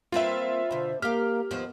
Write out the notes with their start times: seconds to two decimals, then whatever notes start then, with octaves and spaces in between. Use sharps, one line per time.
0.12 A#3 C4 F4 B4 E5
0.71 B2 D3 C5
1.02 A#3 G4 F5 F6
1.51 D#2 F3 B3